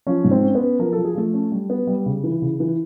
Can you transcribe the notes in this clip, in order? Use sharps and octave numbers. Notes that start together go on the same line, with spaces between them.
F3 C#4 C#5
G#2
C4 C5
C#4
B3 B4
C#4
F3 A#4
F3 A4
G#4
F3 A3 A4
C#4
G3
B3
G3
C#3
E3
C#3
E3